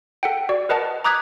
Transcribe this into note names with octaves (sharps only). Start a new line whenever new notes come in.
A4 F#5 G5
F#4 D5
A#4 B4 D#5 F#5 A5
A#5 D6 D#6 F#6 G#6 B6